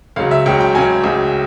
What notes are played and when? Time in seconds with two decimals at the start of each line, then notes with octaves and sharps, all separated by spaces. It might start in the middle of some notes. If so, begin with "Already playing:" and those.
0.16 C#2 C#3 F#3 F5
0.31 E5
0.46 C#2 C#3 F#3 G5
0.60 G5
0.75 C#2 C#3 F#3 G#5
1.04 C#2 C#3 F#3